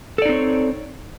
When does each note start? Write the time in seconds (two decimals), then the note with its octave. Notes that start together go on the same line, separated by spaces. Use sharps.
0.18 A4
0.22 D5
0.26 D#4
0.29 C4
0.33 C#5